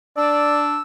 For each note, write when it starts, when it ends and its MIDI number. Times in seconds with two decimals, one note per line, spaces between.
0.17 0.79 62
0.17 0.65 74
0.17 0.82 88